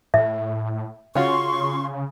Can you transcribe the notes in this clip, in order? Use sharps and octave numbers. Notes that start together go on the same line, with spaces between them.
A2 E5
C#3 C#4 F4 F#4 C6 C#6